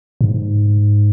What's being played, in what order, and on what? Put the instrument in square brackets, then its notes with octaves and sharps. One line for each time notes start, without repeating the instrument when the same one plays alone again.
[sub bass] G#2